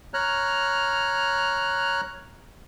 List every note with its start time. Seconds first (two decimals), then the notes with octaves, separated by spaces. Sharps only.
0.14 C#5 A#5 F6 F#6